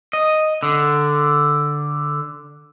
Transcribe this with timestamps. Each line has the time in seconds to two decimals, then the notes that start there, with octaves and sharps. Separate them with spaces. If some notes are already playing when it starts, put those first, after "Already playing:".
0.13 D#5
0.63 D3